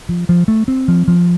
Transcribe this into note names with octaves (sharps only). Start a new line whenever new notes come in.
F3
F3
A3
C4
F3
F3